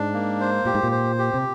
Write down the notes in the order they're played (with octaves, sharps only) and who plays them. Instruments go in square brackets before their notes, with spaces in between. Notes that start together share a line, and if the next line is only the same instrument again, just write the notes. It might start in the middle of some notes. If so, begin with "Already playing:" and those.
Already playing: [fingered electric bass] G#2 [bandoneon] D4
[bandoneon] A#3
C5
[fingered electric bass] A#2 [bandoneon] G4
[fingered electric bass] G#2
A#2
[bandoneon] C5
G4
[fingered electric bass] C3